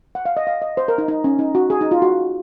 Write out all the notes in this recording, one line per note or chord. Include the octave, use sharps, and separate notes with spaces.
F#5
F5
D#5
F5
D#5
C5
A#4
D#4
D#4
C#4
D#4
F#4
G#4
D#4
F4
F#4